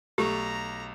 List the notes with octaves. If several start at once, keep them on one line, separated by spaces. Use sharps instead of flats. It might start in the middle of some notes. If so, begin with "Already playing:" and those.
B1 A3 G4 A#5 C#6